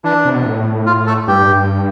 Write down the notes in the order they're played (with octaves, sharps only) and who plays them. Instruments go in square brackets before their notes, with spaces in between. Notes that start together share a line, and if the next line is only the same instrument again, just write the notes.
[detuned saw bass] E3 [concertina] D4
[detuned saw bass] C3
B2
A2
[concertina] F4
A3 A4
[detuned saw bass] G2 [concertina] G4